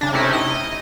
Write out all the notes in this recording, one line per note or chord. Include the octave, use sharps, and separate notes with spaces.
C#3 D4
C3 A3 C#4 D#4 E4
D#5